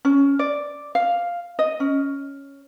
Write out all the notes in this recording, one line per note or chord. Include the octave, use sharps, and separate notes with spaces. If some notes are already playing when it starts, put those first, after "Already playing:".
C#4
D5
F5
D#5
C#4